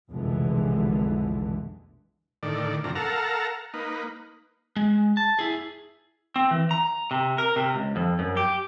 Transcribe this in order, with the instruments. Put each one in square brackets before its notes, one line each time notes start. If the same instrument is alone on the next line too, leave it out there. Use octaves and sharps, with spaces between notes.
[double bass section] F1 B1 D3 E3 G#3
[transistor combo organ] A2 D3 D#3 D5
F#2 C3 F3 D4 A#5
A4 A#4 F5 F#5 A5 A#5
A#3 D#4 B4
[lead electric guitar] G#3
A5
E4 G#4
C4
E3
A#5
C3
A#4
C3
C#2
F2
F#2
G4